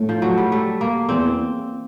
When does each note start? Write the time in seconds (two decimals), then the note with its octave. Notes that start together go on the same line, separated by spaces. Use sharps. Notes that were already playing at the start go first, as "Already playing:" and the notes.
Already playing: A2
0.09 F3
0.22 F#3
0.38 G3
0.52 A3
0.81 A#3
1.09 E2 C4